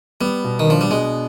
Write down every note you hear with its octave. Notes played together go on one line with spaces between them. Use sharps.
G3 B3
B2
D#3
F3 D4
G3
B2 G#3